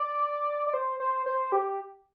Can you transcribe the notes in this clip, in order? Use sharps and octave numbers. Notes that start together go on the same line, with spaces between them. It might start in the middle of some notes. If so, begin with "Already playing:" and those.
Already playing: D5
D5
C5
C5
C5
G4